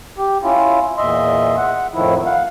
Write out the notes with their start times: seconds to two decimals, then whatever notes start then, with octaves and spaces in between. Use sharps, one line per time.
0.18 G4
0.43 C#4 E4 F4
0.97 E2 A#2 D#5 E5 C6
1.57 F#5
1.94 F2 A2 D#3 F3 E4
2.26 F5 F#5